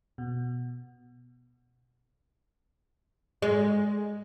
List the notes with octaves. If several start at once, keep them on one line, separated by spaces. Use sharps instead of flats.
B2
G#3